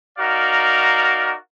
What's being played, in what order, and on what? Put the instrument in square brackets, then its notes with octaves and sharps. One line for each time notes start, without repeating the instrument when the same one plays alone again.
[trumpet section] D#4 F#4 A#4 D5 F5